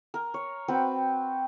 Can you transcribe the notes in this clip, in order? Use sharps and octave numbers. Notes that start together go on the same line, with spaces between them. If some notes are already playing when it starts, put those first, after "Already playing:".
A#4
C#5
C4 F#4 B4 G5